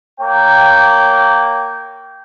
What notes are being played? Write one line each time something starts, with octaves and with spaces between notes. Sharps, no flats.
A#3 C#5 G5